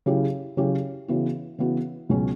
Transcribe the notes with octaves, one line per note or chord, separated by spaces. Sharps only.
C#3 F#3 C#4 E4 G4
C#3 F#3 C#4 E4 G4
C#3 E3 B3 F#4
C#3 E3 B3 F#4
C#2 B2 F#3 C#4